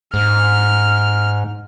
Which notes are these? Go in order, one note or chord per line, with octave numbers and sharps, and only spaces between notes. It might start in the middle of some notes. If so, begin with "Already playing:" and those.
G#2 F6